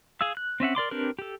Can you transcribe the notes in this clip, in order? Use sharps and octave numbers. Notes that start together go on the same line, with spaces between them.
G#4 F5 E6
F#6
C4 C#4 E5 F#5
A#4 D5 C6 D6
C4 D4 G4 A#4 B4
G4 A4